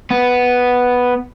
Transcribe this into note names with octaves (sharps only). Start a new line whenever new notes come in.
B3